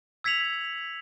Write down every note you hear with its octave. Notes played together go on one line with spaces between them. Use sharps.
E6 G#6 B6 C#7 F7 F#7